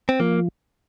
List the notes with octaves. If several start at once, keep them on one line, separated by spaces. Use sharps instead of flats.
C4
F3 A#3